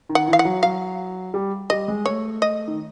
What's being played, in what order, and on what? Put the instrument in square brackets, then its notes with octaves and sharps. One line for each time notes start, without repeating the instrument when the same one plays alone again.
[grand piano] D#3
[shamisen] F#5
[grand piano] E3
[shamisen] F5
F#5
[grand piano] F#3
[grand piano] F#3 [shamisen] F5
[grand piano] G3
[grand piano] G3 [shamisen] D#5
[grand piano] G#3
[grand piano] A3 [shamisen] C#5
[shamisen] D#5
[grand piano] D#3